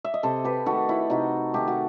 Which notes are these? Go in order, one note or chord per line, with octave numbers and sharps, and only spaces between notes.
E5
D#5
C3 A4 C5
G4 B4
D#3 A3 F#4 A4
E4 G4
C3 D#4 F#4
D#3 A3 G4
F#4